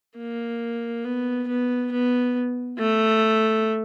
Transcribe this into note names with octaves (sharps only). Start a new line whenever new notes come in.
A#3
B3
B3
B3
A3